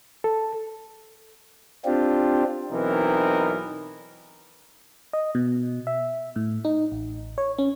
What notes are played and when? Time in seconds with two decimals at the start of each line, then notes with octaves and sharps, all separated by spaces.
0.24 A4
1.85 C4 D4 F4 G4
2.72 B1 E3 C4 D#4 A#4 B4
5.13 D#5
5.35 B2
5.87 E5
6.36 A2
6.65 D#4
6.92 A1
7.38 C#5
7.58 C#4